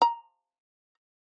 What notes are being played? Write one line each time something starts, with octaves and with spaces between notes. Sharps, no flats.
A#5